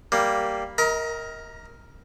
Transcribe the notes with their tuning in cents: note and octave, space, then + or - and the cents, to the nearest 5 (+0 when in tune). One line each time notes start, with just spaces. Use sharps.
G3 +0 A#3 +0
A#4 +0 D#5 +35 A#5 +40